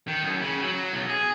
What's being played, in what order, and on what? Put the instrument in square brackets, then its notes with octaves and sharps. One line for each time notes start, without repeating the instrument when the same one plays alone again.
[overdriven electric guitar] D#3
F#2
C#3
F#3
B1
G#4